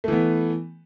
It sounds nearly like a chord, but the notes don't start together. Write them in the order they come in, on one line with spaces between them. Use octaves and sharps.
A3 E3 B3